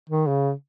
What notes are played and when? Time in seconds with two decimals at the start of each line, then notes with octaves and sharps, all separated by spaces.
0.09 D#3
0.27 C#3